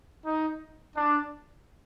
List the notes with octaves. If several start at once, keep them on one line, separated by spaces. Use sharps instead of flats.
D#4
D4